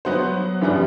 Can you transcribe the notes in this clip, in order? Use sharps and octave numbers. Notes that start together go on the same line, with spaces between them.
F#3 B3 F#4 C5
F#2 E3 G3 B3 D4